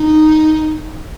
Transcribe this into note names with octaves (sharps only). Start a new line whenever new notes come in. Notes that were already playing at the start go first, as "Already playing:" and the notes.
Already playing: D#4